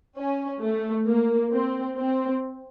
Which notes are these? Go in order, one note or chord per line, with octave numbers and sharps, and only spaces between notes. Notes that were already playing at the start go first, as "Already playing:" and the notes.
C#4
A3
A#3
C4
C4